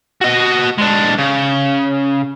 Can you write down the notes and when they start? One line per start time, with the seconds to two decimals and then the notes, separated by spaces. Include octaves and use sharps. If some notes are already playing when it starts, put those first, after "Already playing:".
0.21 F#4 D#5
0.78 G#3 D4
1.18 C#3